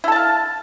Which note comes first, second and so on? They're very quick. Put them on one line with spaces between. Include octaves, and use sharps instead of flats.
E4 A4 A5 F5